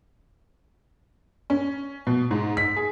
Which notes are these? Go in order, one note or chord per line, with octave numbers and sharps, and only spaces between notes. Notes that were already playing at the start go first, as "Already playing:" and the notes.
C#4
B2
G#2
B6
G#4